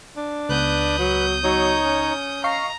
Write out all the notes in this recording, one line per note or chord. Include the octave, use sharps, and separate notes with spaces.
D4
C#2 B3 B4 D#6 F#6 G6
F#3
F#3 D#4 C#5
C#4
D#5 F5 A#5 C#6 C7